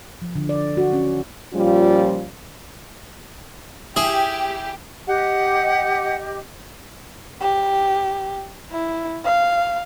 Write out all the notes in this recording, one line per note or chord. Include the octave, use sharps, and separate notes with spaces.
F3
D3
D5
F#4
C#4
A#2 F3 G3 C#4 F4
E4 G4 G#4
G4 D#5 F#5
G4
E4
F5